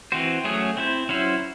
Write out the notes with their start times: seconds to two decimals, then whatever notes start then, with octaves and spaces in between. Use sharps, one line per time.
0.12 E3 C4 F#4 C5
0.44 F#3 A3 C#4 G#4 C#5
0.77 C4 E4 C5
1.09 F#3 C#4 E4 C5